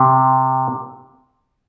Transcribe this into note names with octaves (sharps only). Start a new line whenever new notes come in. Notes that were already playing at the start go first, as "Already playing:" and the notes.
Already playing: C3